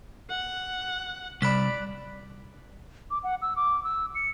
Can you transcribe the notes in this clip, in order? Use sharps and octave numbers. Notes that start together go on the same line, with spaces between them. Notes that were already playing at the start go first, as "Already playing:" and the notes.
F#5
C2 D5 B5 F#6 B6
D6
F#5
E6
D6
E6
C#7